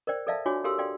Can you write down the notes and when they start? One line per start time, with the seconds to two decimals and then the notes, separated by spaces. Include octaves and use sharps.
0.07 A#4 C5 D5 G5
0.27 A4 A#4 D5 E5 F5 A5
0.45 D4 F4 F#4 C#5 G#5 D6
0.64 G4 A4 A#4 F5 C6 E6
0.78 A4 D5 F5 G5 C6